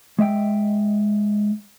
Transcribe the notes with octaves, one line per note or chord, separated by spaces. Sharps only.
G#3 D#5 E5 G5